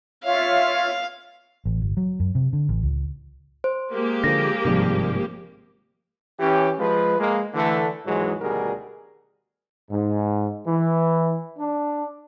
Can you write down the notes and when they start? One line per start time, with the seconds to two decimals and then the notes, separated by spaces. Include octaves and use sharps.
0.24 F4 C#5 E5 F5
1.66 A1
1.81 G1
1.97 F#3
2.20 F#2
2.35 C3
2.53 D3
2.69 A1
2.83 C#2
3.64 C5
3.93 G#3 A#3 G4
4.24 D3 F3 A#6
4.65 G#1 G2 C3 D#3 F3 G3
6.40 E3 C#4 G4
6.79 F3 G#3 B4
7.19 G#3 A#3
7.54 D3 E3 A3
8.06 D#2 G#2 E3 F#3 G#3
8.40 D2 B2 D#3 G3 G#4 A#4
9.90 G#2
10.66 E3
11.59 D4